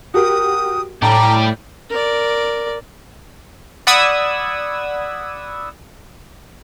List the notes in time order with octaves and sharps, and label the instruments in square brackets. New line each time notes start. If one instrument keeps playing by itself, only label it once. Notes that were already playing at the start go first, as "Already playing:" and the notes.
[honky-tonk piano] F#4 G4 A#4 [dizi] D#6
[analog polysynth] A2 [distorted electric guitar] G3 G4 [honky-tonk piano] A5 D6 [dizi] A#5
[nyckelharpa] A#4 D5
[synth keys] D5 F#5 B5 D#6 E6 G#6